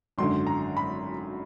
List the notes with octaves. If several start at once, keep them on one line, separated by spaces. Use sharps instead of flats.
G#1 F#2 D3 C6
A#5
B5